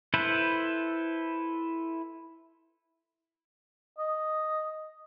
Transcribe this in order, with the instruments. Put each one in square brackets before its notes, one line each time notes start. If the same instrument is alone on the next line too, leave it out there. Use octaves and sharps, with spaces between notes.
[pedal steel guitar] E4 A4 B4 C5
[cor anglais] D#5